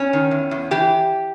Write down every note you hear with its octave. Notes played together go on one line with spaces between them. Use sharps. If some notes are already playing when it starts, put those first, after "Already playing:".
Already playing: C#4
D#3
E2
E2
E3 G4